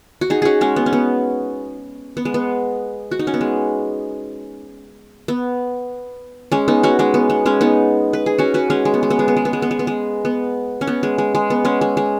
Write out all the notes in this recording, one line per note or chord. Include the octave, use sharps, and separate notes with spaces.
F#4
D#4 G#4
C#4 F#4 G#4
G#3 C#4
B3
C#4
B3
B3
G#3
B3
F#4
D#4
C#4
B3
G#3
B3
G#3 C#4
B3 D#4
C#4 F#4
G#3 C#4
B3
B3
G#3 C#4
B3 D#4
B4
G#4
C#4 F#4
F#4 B4
G#3 C#4
G#3
B3
G#3
B3
G#3
B3
G#3
B3
G#3
B3
G#3
B3
G#3
B3
C#4
B3
G#3
G#3
G#3
B3
G#3 C#4
G#3
G#3